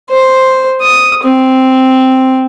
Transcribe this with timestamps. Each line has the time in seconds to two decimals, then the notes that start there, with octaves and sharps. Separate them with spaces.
0.10 C5
0.81 D#6
1.23 C4